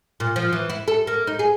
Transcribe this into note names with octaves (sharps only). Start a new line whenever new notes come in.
A#2
F3
E3
E4
A4
A#3
D#4
G#4